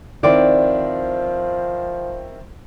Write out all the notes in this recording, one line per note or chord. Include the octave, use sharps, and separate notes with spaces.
D#3 F3 C4 E4 D5